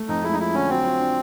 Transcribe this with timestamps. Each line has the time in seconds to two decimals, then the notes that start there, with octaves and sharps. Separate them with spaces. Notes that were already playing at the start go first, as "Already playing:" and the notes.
Already playing: A3
0.09 F2 D#4
0.23 G#3 E4
0.33 D#4
0.39 F3 E4
0.54 D3 C#4
0.70 F#3 C4
0.84 F4
1.00 D4